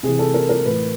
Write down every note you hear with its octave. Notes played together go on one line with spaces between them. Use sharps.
C3 E3 G#4
A4
A#4
A#4
A2 E3 B4